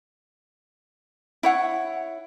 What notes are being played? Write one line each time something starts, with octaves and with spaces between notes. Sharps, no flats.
E4 C#5 F#5